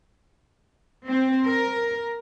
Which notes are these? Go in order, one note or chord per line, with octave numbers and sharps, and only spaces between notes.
C4
A#4